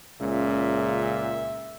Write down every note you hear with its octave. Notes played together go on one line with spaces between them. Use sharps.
C#2 A#2 C#3 E5